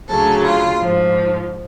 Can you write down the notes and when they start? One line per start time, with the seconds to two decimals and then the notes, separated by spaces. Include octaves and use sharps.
0.08 D2 C#3 F#3 A4
0.43 F4
0.79 G#2 F3